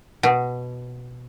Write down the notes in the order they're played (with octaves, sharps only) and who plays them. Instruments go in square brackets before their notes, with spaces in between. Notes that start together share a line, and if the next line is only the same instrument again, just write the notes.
[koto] B2